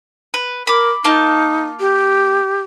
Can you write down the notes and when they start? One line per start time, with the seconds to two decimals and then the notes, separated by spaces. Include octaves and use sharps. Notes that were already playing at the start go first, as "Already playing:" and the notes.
0.34 B4
0.67 A#4 B5 D6
1.04 A#3 D#4 F4 A5
1.80 G4